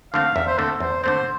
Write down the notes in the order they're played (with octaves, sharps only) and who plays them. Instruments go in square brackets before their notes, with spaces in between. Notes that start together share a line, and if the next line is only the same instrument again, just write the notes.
[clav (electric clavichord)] D3 A3 C4 [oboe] F5
[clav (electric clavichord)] E2 [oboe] E5
[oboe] C5
[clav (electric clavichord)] D3 A3 C4 [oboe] A4
[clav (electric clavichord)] E2 [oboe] C5
[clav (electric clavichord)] D3 A3 C4 [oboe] C5